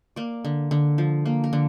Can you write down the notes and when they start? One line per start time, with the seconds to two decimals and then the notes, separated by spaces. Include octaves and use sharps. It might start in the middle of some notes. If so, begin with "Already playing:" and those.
0.16 A#3 D5
0.45 D3
0.71 D3
0.98 F3
1.25 A#3
1.44 A#4
1.53 D3